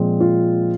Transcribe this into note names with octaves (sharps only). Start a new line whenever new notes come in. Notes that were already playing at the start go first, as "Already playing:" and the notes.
Already playing: A#2 F3 G#3 C4
F4